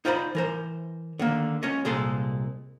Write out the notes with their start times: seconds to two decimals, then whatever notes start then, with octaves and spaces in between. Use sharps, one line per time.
0.05 D#4 F4 C5 D5 A#5 B5
0.35 E3 A#4 C5
1.19 D3 D#3 A#3
1.63 G#3 C#4 C#5 D#5
1.85 C2 A#2 G#3 A4 C6